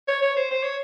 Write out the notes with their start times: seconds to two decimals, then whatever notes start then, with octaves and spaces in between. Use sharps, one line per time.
0.08 C#5
0.22 C#5
0.36 C5
0.51 C5
0.63 C#5